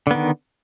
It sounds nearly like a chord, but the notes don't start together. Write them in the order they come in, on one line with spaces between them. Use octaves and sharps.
D3 B3 D#3